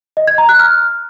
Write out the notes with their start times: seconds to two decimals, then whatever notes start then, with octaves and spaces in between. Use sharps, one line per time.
0.17 D#5
0.27 G#6
0.38 A#5
0.49 F#6
0.59 F6